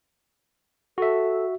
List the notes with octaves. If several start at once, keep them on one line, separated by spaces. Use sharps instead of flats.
F#4 A4 E5